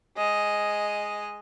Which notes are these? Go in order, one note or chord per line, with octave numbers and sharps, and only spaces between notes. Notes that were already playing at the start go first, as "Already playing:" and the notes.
G#3 D#5